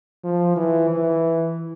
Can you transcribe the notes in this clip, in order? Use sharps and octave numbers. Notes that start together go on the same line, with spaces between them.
F3
E3
E3